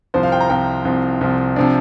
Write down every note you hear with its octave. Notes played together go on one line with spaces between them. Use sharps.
C2 C3 F3 C5
F5
G5
A#5
C2 C3 F3 G5
C2 C3 F3
C2 C3 F3
C3 F3 D4